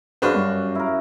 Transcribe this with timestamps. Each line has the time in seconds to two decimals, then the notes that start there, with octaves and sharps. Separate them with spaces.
0.22 F#2 D4 F#4 G#4 B4 C5 F5
0.35 G2
0.75 E4 A#4